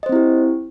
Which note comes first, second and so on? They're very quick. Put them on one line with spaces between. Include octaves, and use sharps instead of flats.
D#5 C5 C4 E4 G4